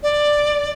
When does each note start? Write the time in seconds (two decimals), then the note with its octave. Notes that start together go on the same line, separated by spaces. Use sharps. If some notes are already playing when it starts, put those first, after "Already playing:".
0.03 D5